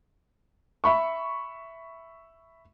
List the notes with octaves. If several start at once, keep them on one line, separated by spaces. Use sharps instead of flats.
E5 B5 C#6